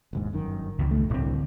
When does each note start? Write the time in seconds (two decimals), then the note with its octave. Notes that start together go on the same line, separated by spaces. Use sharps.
0.13 E1 D#2 G#2
0.33 G1 F#2 D#3
0.78 C#2 D#3 E3
0.91 A3
1.10 D1 C2 C4